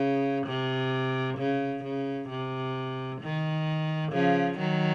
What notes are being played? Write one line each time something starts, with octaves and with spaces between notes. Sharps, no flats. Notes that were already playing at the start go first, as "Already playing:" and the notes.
Already playing: C#3
C3
C#3
C#3
C3
D#3
C#3 F3
D#3 F#3